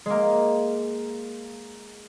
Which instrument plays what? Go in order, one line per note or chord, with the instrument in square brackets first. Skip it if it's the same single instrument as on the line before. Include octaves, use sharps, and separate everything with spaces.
[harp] G#3 A#3